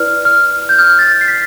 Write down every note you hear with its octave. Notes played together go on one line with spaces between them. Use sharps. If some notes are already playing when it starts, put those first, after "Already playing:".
Already playing: E4 B4 D5 F6
F6
G6
F6
G6
A6
C7
B6